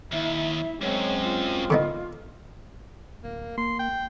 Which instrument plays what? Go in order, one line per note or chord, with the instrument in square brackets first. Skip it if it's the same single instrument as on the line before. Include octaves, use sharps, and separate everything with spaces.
[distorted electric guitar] D#2 [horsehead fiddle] E4 [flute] E5
[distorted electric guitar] F#2 [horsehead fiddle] G#3 C4 [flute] C#5
[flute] F4
[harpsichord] D3 B3 D#4
[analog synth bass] D1 [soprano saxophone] A#3
[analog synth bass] A#3 [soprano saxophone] C6
[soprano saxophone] G5